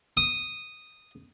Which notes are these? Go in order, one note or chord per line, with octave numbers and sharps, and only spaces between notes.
D#6